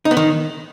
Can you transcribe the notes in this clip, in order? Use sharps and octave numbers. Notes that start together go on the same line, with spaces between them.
D#4
B3
D#3